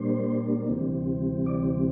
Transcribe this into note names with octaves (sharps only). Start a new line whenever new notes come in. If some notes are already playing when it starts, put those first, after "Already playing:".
Already playing: A#2 G3 A#3 D4 C5
D2 C3 E3 G3 C4
D5